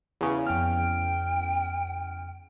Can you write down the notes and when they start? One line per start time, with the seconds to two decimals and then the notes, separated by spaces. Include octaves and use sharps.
0.21 E2 C#3
0.47 F2 G5 F6